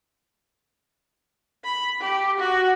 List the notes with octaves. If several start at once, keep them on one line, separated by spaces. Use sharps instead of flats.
B5
G4
F#4